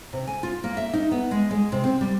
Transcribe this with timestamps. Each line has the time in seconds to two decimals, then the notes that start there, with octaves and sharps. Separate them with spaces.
0.13 C3
0.27 G#5
0.43 F4
0.64 A#3
0.77 E5
0.93 D#4
1.11 B3
1.31 G#3
1.51 G#3
1.72 C3
1.84 C4
2.01 G3